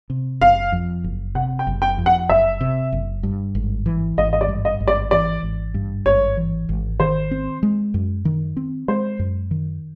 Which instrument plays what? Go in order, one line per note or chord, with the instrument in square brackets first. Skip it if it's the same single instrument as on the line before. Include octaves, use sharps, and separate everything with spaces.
[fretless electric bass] C3
[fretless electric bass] F#1 [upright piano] F5
[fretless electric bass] F2
F#1
[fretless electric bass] C3 [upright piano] F#5
[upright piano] G5
[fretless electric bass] F#1
[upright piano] G5
[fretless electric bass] F2
[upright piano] F#5
[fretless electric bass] F#1 [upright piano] E5
[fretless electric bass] C3
F#1
G2
G#1
E3
[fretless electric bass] G#1 [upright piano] D#5
[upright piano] D#5
D5
[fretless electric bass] G2
[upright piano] D#5
[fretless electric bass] G#1
[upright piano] D5
[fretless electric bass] E3 [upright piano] D5
[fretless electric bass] G#1
G2
[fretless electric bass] G#1 [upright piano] C#5
[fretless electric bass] E3
G#1
[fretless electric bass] D#3 [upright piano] C5
[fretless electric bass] C4
G#3
F#2
D#3
C4
[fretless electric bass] G#3 [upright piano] C5
[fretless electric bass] F#2
D#3